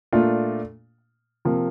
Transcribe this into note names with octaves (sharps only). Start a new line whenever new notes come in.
A#2 A3 D4 F4
C3 F3 A#3